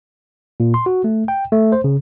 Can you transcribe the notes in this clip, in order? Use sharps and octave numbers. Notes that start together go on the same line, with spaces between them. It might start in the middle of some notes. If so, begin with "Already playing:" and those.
A#2
C6
F#4
A3
G5
A3
C5
C#3